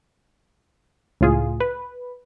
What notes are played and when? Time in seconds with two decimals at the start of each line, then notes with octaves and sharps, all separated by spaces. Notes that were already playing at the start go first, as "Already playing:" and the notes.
1.21 C#2 A2 F4 G#4
1.60 B4